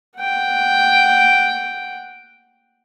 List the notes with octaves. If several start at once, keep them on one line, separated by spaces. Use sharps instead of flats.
F#5 G5